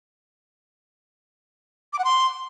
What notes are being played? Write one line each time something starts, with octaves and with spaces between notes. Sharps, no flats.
D6
F#5
C6